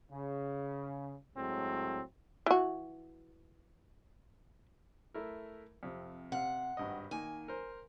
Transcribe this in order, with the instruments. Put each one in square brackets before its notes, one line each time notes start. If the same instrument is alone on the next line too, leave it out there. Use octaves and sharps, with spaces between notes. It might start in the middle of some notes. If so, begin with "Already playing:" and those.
[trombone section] C#3
A2 F#3 G#3 C4
[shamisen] E3 F#4
[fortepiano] A3 E4 A#4
F2 C3
[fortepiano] C3 F5 [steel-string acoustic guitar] F#5
[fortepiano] G#1 G2 D#5
[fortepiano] D#3 A#3 D#4 [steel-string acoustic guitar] G#5
[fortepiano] A#4 C5